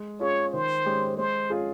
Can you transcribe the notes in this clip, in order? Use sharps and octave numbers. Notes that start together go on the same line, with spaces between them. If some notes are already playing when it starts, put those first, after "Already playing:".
Already playing: G#3
C#4 F4 G#4 C#5
D#3 C5
G#3 C#4 G4
G#3 C5
C#4 F4 G#4